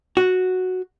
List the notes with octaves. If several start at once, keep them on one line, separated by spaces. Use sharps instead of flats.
F#4